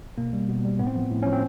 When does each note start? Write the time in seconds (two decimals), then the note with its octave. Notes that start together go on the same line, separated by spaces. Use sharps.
0.18 B2 A#3
0.33 G3
0.48 B2
0.65 G3
0.79 A2 B3
0.87 C4
0.94 F3 B3
1.11 A2
1.23 F3 C#4
1.33 C4